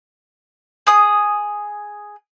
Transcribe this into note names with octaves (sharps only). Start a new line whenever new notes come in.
G#4 D#6